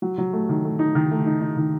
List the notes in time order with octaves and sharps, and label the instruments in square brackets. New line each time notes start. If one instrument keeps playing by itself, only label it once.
[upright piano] F#3
F#3
A3
D#3
A3
D#4
D#3
A3
D#4
D#4
D#3